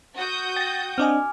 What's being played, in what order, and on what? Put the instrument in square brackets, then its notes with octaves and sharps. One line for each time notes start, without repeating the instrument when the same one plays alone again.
[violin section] F#4 D#6 G6
[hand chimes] G5 [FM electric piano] A6 A#6
[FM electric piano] C4 D4 D#5 [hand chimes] G#5 D6 F6